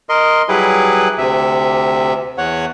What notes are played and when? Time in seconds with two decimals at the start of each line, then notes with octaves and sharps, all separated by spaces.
0.09 A#4 D#5 C6
0.49 F#3 G3 E4 G#4 B4
1.18 D2 C3 E5
2.38 E2 C#5 F#5